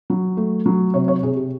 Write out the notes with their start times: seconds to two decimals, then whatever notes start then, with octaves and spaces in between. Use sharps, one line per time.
0.10 F#3
0.37 A3
0.66 F#3
0.94 C3 C#5
1.08 C#5
1.23 C3 G#4
1.36 G4